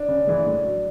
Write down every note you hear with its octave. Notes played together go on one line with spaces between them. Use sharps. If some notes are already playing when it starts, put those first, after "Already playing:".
Already playing: D4
C#3
E3 G#3
A2
F#3